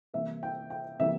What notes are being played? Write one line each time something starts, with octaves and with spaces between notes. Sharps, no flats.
C3 E3 G3 A#3 E5
G5
G5
C3 E3 G3 A#3 E5